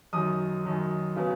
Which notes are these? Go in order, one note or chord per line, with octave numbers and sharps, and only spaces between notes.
F#2 D#3 F#3 D#6
F#2 D#3 F#3
C#3 F#3 B3